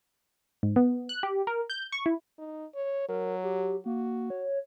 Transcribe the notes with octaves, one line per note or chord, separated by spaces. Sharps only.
G#2
B3
F#6
G4
A#4
G6
C#6
E4
D#4
C#5
F#3 A#4
G4
A#3 F#4
C#5